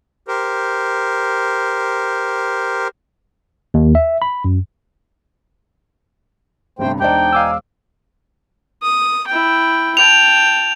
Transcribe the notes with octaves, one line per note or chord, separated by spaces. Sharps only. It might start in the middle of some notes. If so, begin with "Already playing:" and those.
G4 A#4 C5
D#2
E5
B5
F#2
G1 G2 C3 A3 C5 G5
E1 D4 D#4 C5 D5 G5
D#4 F5 G#5 D6 E6
D#6
E4 G5
G5 A5 F7